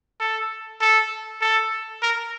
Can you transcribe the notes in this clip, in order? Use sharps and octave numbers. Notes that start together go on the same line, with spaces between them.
A4
A4
A4
A#4